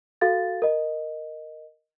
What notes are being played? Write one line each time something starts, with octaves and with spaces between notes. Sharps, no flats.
F#4 A4 F5 A6
A#4 D#5